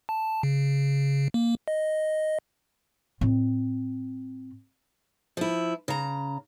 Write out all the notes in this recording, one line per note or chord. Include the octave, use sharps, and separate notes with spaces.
A5
C#3
A#3
D#5
A2 C4
F3 E4
C#3 A#5